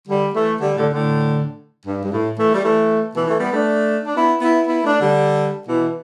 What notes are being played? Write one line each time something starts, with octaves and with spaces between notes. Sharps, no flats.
D3 G3
E3 A3
D3 G3
A2 D3
A2 D3
G2
G2
A2
E3 A3
G3
E3 A3
B2 E3
E3 A3
G3 B3
A3 D4
D4
B3 E4
B3 E4
B3 E4
A3 D4
D3 G3
B2 E3